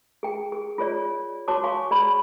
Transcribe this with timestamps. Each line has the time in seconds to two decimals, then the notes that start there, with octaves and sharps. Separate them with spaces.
0.23 G#4 G5
0.52 G#4
0.78 F4 G#4 C#5 D5
1.48 F#4 C#5 A5 D6
1.64 F5 G#5 C6 C#6
1.91 G#4 D5 B5